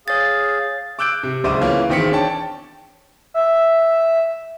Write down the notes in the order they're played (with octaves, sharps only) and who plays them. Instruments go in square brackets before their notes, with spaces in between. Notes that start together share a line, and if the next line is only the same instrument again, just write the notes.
[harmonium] G#4 F5 [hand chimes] C#5 A6
[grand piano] D6 E6 F#6 G6 D7
C3
D1 C#2 C5 E5 D6 D#7
E3 A#3 C#4 F4
E1 D#3 C4 B6 C#7
D4 C#5 G5 A5
[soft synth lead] E5